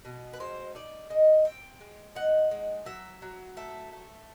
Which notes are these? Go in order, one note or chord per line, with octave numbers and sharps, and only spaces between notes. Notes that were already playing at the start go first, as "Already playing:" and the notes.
B2
B4
G#3 C5
D#4 D5
G#3 D#5
C4 G5
G#3
D#4 F#5
G#3
F#3 E5
F#3
A3 E5
A3